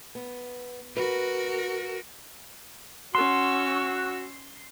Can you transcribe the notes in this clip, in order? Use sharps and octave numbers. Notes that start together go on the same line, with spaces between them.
B3
F#4 A#4 B4
C#4 F#4 C6 C#6 E6